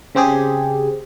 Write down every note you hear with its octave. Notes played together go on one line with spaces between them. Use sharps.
C#3 C4 G4 G#4